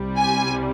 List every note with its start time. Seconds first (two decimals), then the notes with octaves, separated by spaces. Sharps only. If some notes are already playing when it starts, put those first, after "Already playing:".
Already playing: C2 C3 G3
0.17 G#5